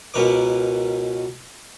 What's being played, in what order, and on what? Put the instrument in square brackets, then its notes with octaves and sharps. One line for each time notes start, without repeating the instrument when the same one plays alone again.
[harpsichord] C#2 B2 A#4 B4 C#5 D6